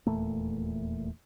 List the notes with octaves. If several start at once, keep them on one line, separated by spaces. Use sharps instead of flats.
D#1 E2 A#2 A3